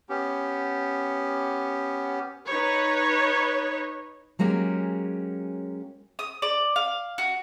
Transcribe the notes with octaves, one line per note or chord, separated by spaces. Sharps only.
B3 C#4 G4
D#4 B4 C#5
F#3 G#3 A#3 C#4 G4
D#6
D5
F5
F#4